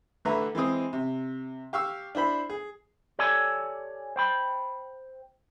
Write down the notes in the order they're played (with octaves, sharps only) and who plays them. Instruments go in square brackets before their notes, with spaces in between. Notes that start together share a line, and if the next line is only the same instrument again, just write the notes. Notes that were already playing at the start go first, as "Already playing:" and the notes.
[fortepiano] A1 D3 B4 E5 A#5
E3 G#3 C4 D#6
C3
G4 F5 C#6 E6
D4 E4 C5 B5
G#4
[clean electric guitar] G4 A4 C#5 D5 G#5 A5
C5 G5 B5